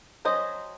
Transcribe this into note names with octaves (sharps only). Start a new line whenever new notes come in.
F#3 C#4 C5 D#5